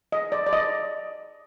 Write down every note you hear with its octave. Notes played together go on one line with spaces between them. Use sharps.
D#5
D5
D5
D#5